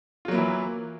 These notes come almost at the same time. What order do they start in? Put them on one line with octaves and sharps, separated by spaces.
F4 F#3 A#3 E4 E3